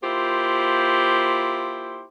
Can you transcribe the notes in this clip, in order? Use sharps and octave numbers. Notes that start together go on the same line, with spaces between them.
A#3 E4 F4 G4 C5